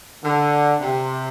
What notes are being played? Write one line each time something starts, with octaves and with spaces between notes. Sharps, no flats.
D3
C3